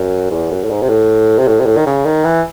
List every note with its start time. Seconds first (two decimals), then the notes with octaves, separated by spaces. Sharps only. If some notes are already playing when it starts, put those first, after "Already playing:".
Already playing: F#2
0.31 E2
0.51 F#2
0.63 A2
0.70 G#2
0.82 C3
0.89 A2
1.39 C3
1.48 A2
1.60 C3
1.66 A2
1.77 D#3
1.86 C#3
2.06 D#3
2.24 E3